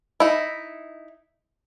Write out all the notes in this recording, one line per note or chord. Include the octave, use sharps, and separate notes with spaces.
D#4 E4